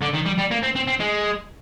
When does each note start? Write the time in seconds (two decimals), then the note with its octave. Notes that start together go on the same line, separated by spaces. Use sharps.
0.02 D3
0.14 D#3
0.26 G3
0.38 G3
0.51 A#3
0.63 C4
0.76 C4
0.87 C4
1.00 G#3